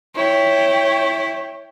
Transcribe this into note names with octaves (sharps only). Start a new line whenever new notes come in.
E4 C#5 G5